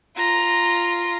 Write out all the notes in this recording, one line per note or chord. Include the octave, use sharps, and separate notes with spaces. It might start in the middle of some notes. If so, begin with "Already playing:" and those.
F4 A#5